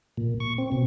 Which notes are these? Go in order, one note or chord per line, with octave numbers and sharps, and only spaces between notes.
A#2
C#6
C4
B2